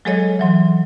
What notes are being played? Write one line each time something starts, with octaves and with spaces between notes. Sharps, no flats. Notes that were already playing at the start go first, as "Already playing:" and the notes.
F#3 G#3 G#4 A4 C#5 D#5
E3 F#3 C6